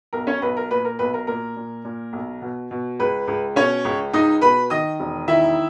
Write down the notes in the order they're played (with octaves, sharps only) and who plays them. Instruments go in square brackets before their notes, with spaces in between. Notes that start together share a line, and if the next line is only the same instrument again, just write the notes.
[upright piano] B1 A#4
C#4 C#5
B1 B4
A#4
A#2 B4
A#4
B1 B4
A#4
A#2 A#4
A#2
A#2
B1
B2
B2
C#2 B4
C#2
B2 C#4 C#5
C#2
C#2 D#4 D#5
B2 B4 B5
D#3 D#5 D#6
E1
D#3 E4 E5